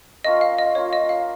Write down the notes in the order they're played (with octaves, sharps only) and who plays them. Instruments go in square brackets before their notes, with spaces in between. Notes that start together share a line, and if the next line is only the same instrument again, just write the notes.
[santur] A#3 C#4 F4 [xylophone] D#5
[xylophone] F5
D#5
[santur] A#3 C#4 F4 [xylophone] C#5
[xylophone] D#5
F5